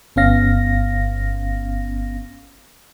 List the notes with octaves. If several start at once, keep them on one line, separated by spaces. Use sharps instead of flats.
G1 B3 C#4 F5 A#6